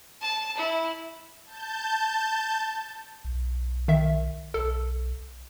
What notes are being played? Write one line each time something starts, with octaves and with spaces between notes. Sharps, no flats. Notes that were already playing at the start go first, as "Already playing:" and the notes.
A5
E4
A5 G6
B1
D#3 E5
B1 A4